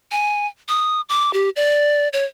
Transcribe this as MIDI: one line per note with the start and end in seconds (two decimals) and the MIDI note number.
0.12 0.47 80
0.68 1.01 87
1.09 1.33 86
1.34 1.49 67
1.56 2.08 74
2.13 2.25 73